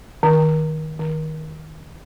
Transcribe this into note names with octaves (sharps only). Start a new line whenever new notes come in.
D#3
D#3